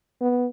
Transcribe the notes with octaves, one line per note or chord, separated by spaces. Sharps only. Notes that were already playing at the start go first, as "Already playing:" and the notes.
B3